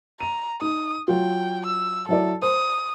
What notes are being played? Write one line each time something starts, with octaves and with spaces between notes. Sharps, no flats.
A#5 D#7
D#4 D#6
F#3 F4 G5
E6
F#3 E4 A4 D5
C5 D#6